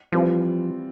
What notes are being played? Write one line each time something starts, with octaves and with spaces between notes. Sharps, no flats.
E3 F3 G3 C4 F4